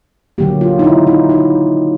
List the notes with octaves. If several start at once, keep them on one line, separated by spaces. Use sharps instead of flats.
D3 F#3 A#3 G4
F4
D#4
E4
D#4
D#4